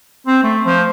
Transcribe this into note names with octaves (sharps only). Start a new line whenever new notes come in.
C4
A3
F3